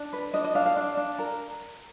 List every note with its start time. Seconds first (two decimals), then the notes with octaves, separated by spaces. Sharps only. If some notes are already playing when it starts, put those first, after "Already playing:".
Already playing: D4
0.13 B4
0.34 D4 D#5
0.44 D#5
0.55 D4 F5
0.66 F5
0.77 D4
0.97 D4
1.19 A#4